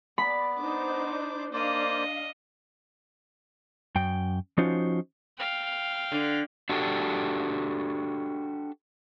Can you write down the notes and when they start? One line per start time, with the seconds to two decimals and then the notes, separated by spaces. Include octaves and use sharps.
0.18 B3 D5 B5
0.59 D4 D#4 C5 D6
1.53 A#3 D4 C5 D5 D#5 F5
3.95 F#2 G5
4.58 F3 C#4 D#4 F4 F#4 C5
5.38 F5 G5
6.12 D3
6.69 D4 F#4 G4 A4